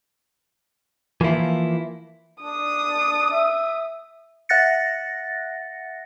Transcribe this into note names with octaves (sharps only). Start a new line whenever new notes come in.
E3 F3 A#3 E4
D4 D#6
E5
E5 F#5 F#6 A6 A#6 C#7